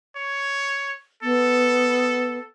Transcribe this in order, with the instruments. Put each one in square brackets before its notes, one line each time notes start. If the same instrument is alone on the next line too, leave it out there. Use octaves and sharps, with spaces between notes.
[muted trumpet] C#5
[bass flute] B3 [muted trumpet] A4